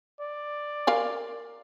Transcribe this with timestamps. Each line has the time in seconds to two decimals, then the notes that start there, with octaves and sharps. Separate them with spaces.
0.21 D5
0.87 A#4 F5 G#5